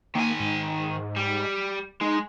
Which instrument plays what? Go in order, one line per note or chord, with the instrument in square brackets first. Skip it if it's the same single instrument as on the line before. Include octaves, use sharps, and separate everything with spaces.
[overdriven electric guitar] D#3 G#5 [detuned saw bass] A#3
[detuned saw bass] G#2
[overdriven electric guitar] G3
[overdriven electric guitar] G#3 [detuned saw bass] D#4